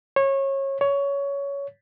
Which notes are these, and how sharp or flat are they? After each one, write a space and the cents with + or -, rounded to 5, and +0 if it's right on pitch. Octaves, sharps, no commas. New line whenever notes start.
C#5 -25
C#5 +15